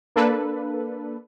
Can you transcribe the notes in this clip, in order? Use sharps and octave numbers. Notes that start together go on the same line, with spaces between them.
A#3 D4 A4 B4